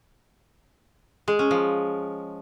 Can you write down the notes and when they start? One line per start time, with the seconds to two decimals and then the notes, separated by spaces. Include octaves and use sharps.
1.28 G#3
1.39 C#4
1.51 F3